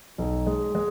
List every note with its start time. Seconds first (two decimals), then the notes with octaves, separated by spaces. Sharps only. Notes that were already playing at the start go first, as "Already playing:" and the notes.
0.18 B1
0.47 G#3
0.75 G#3